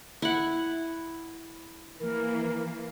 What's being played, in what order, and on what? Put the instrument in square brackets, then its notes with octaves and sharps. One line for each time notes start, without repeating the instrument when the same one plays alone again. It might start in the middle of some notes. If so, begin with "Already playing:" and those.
[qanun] E4 F#5
[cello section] E3 A#3 [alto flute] A#4